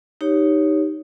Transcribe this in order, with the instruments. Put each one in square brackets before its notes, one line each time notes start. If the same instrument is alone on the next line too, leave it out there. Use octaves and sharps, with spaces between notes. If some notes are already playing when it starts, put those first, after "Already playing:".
[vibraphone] D#4 G4 C#5